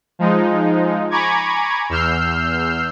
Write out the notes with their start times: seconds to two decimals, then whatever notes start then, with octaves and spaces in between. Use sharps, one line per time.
0.19 F3 G#3 D#4
1.10 G#5 A#5 B5 C#6 D6 G#6
1.89 E2 E6 F6 G6 C7